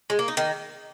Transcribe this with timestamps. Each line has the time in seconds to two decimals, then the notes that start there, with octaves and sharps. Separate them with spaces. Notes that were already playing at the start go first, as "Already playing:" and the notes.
0.10 G#3
0.19 A#3
0.28 D#4
0.37 D#3